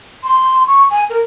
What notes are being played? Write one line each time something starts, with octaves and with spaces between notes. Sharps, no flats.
C6
C#6
G#5
A#4